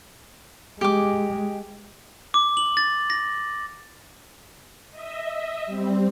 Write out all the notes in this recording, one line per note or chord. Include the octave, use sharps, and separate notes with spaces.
G#3 G4 D6
D6
F#7
A6
A#6
D#5 E5
G3 C4